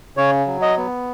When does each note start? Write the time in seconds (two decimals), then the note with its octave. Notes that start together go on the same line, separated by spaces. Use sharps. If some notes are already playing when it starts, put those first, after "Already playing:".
0.17 C#3 C#5
0.47 F#3
0.62 D#5
0.77 B3